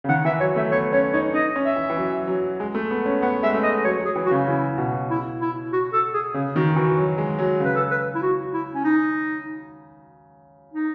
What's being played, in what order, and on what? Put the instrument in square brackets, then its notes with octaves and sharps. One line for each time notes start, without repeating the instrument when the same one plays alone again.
[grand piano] C#3
[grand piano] D#3 [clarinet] F#5
[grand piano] E3 [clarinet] E5
[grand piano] F#3 [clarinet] C#5
[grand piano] A3 [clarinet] E5
[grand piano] B3 [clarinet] C#5
[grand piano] C#4 [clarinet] C#5
[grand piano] D#4 [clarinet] C#5
[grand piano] D#4 [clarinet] D#5
[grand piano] C#4
[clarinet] E5
[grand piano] E3
E3
F#3
F#3
G#3
A3
B3
C#4
[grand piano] B3 [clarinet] F#5
[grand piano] G#3 [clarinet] E5
[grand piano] A3
[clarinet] D#5
[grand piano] F#3 [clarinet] C#5
[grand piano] F#3
[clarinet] G#4
[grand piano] E3
[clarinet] F#4
[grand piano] C#3
[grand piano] C#3 [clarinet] E4
[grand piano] B2
[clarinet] E4
E4
F#4
A4
G#4
[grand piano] C#3 [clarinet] G#4
[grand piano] D#3 [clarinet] F#4
[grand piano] E3 [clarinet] F#4
[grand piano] F#3
G#3
F#3
[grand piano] C#3 [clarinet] B4
[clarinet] A4
B4
E4
F#4
E4
C#4
D#4
D#4